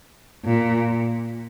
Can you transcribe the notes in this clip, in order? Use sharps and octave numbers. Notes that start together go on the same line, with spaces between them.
A#2